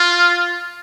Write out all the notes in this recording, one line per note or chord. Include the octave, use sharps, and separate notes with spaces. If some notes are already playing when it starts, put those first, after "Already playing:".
Already playing: F4